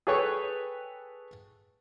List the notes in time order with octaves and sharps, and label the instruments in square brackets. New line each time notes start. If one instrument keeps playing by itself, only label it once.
[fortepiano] G#4 A4 B4 C#5 G5